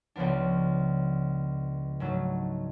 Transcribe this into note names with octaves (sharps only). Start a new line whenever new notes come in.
C#2 C#3 F3 B3 D4
G#2 F#3 A3